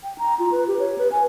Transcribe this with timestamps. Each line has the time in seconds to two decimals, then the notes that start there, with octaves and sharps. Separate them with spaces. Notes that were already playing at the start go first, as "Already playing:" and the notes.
0.03 G5
0.18 A#5
0.39 F4
0.52 B4
0.68 G4
0.79 C#5
0.98 B4
1.12 G#5